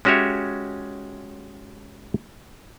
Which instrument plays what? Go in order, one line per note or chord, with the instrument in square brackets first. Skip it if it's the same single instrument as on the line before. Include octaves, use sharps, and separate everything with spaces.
[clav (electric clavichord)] G#3 C#4 F#4 G4 C#5 E5